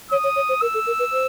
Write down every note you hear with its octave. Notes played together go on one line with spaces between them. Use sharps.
C#5 D#6
C#5
C#5
C5
A#4 E6
A4
A#4
B4
C5